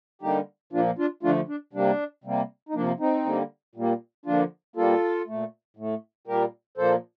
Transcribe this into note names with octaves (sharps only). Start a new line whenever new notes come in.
D3 G3 A#3 D#4 G4
A#2 F3 A#3 D4 F4
D4 F4
D3 F3 A3 D4 F4
D4
C3 G3 A#3 D4
C3 G3 A#3
D#4
C3 F3 A#3 D4
C4 D#4
D3 G3 A#3
A#2 G3 A#3
D3 F3 A#3 D4 F4
A#2 G3 A#3 F4 A4
A#2 A3
A2 A3
A#2 G3 A#3 G4 A#4
A#2 F3 A#3 A4 C5